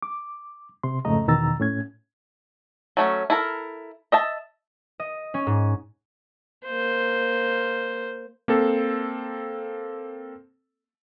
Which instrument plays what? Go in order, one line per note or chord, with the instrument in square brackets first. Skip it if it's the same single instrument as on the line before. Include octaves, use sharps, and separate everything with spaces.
[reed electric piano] D6
C3 C6
F2 G#2 C#3 A3 D#5 A#5
E2 B2 D#3 A#5 E6 A6
A2 C#4 G#6
[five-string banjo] F#3 A3 C#4
E4 A4 A#4
D#5 E5 A5
[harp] D#5
C#4
G#2
[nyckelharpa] A#3 C5
[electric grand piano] A#3 C4 A4